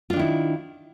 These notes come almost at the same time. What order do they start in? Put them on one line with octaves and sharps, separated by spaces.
F4 D4 D#3 E4